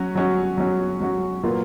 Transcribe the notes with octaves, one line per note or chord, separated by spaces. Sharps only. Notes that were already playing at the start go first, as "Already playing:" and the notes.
Already playing: F#3 C#4 F#4
F#3 C#4 F#4
F#3 C#4 F#4
F#3 C#4 F#4
A#2 F#3 A#3 F4 B4